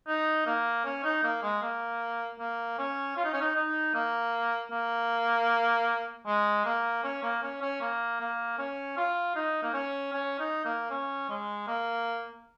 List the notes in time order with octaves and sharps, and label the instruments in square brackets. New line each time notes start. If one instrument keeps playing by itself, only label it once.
[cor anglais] D#4
A#3
C#4
D#4
A#3
G#3
A#3
A#3
C#4
F4
D#4
C#4
D#4
D#4
A#3
A#3
G#3
A#3
C#4
A#3
C#4
C#4
A#3
A#3
C#4
F4
D#4
A#3
C#4
C#4
D#4
A#3
C#4
G#3
A#3